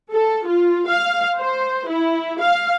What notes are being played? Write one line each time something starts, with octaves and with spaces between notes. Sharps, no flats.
A4
F4
F5
C5
E4
F5